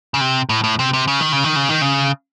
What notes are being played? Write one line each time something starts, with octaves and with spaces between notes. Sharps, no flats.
C#3
C3
A2
A2
C3
C3
C#3
D#3
C#3
D#3
C#3
D#3
C#3